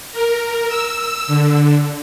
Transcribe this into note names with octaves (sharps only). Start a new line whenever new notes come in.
A#4
E6
D3